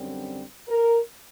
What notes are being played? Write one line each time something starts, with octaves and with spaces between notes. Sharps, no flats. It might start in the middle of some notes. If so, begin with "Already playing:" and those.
Already playing: F#2 D3 G3 C4
A#4